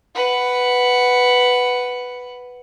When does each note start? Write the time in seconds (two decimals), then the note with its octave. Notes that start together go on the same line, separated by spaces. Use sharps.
0.15 B4 F#5